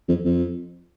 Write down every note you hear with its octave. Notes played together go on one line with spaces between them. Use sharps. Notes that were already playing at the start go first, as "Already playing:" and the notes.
F2
F2